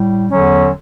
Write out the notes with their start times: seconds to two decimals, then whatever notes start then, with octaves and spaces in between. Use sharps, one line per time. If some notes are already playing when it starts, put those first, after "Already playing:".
Already playing: A2 G3
0.28 E2 D3 F#3 C#4